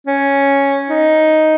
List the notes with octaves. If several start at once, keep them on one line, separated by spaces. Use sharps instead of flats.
C#4
D#4